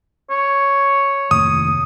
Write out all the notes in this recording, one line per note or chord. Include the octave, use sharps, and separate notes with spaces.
C#5
F1 D#2 A2 D#6